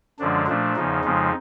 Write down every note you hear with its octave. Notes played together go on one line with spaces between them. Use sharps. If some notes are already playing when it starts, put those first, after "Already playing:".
F#2 D3 F3 G#3 D4
A#2 F3 A3 D4
E2 C#3 F3 D#4
F2 C#3 F3 G#3